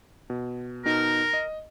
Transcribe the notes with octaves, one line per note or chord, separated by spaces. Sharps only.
B2
B2 D#4 A#4
D#5